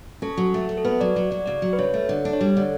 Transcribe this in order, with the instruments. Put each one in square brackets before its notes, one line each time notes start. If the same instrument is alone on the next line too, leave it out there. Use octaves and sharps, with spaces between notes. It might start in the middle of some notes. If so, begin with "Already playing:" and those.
[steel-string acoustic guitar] C#4 [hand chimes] A4
[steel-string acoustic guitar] F#3
A3
F#3
[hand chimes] A4
[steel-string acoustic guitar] B3 [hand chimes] B4
[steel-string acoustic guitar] F#3 [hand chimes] D5
[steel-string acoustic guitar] F#3 [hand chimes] D5
[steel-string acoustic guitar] F#3 [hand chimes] D5
[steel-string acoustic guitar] C#3 [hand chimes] D5
[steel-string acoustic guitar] F#3
[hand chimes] B4
[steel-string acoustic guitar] C#3 [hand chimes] C#5
[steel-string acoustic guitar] A3
D3
D4
[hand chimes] C#5
[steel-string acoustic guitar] G3 [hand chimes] D5
[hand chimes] D5
[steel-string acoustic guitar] D3 [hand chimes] C#5